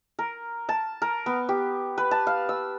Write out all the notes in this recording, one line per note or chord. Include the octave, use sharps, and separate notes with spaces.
A#4
A5
A#4
B3
G4
B4
A5
F5
E6